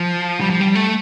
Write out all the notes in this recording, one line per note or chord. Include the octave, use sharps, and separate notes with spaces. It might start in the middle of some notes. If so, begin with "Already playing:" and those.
Already playing: F3
G3
F3
G3
A3